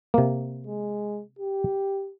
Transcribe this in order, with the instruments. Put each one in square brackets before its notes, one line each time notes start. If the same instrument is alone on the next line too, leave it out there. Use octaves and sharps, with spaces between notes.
[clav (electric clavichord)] C3 A#3
[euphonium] G#3
G4